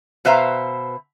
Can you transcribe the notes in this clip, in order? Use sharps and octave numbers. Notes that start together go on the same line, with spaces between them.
B2 B4 C5 E5 F5 A#5